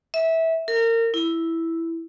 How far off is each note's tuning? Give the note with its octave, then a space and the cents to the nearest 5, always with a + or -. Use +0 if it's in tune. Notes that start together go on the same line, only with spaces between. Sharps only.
E5 -20
A#4 -30
E4 +0